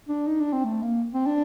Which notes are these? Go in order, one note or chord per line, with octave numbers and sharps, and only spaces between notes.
D4
D#4
D4
C4
A3
A#3
C4
D4